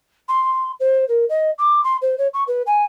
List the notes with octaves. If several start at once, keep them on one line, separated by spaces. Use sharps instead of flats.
C6
C5
A#4
D#5
D6
C6
C5
C#5
C#6
B4
G#5